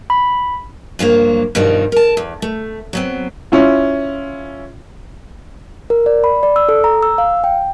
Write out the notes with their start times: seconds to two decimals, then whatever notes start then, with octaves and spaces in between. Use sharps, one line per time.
0.10 B5
0.99 G2 F3 F#3 A#3
1.55 G2 B2 D#3 F3 G3
1.92 A#4 A5
2.17 E2
2.42 A3
2.93 F#3 B3 C4
3.52 C#4 E4 F4
5.90 A#4
6.06 D5
6.24 B5
6.43 D5
6.56 E6
6.69 A4
6.84 A#5
7.03 E6
7.18 F5
7.44 G5